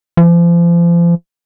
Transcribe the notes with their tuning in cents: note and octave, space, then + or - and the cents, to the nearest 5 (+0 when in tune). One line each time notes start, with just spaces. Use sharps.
F3 -35